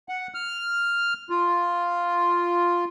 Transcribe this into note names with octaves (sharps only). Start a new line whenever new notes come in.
F#5
F6
F4